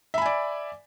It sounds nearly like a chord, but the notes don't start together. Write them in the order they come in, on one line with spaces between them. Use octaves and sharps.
E5 B5 G#5 D5